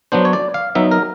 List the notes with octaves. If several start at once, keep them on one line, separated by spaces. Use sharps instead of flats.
F#3 B3 D4 C5
C#5
D5
F5
F#3 B3 D#4 E5
A#4